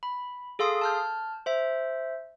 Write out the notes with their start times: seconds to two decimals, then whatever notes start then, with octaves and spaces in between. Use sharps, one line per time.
0.03 B5
0.59 G#4 A4 F5 C6 D#6 D7
0.81 A5 F6 G6
1.46 C5 E5